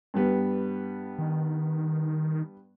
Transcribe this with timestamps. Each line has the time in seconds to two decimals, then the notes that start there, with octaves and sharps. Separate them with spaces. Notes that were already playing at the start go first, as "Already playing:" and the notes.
0.14 G2 G3 B3
1.18 D#3